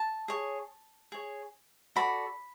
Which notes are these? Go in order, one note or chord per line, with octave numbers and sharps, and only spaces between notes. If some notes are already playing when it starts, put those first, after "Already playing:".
Already playing: A5
G#4 C#5
G#4 C#5
F#4 A4 D5 B5